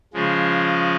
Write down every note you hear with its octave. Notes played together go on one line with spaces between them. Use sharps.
C#3 F3 G#3